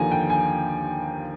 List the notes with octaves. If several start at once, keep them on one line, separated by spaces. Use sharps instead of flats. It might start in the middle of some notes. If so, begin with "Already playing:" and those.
Already playing: D#2 D3 F3 G#5 A#5
G5
G#5